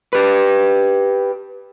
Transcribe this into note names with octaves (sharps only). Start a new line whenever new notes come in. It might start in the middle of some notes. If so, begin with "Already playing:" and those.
G4 B4